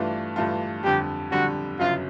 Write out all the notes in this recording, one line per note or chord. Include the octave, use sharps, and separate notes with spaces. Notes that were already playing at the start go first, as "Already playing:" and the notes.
Already playing: G2 E3 A3 D4 F4
G2 E3 A3 D4 F4
F2 D3 G3 G4
F2 D3 G3 F#4
G1 F#2 C#3 F#3 F4